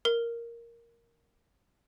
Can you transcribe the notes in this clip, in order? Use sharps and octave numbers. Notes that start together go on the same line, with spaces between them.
A#4 G7